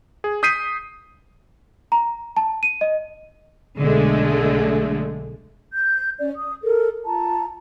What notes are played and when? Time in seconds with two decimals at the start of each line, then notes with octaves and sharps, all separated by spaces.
0.24 G#4
0.43 D#6 G6 B6 C7 D#7
1.92 A#5
2.37 A5
2.63 D#7
2.81 D#5
3.79 B1 D3 G#3 A3
5.72 G6
6.18 C#4 D5
6.37 D#6
6.62 A4 A#4
7.05 F4 A5 A#5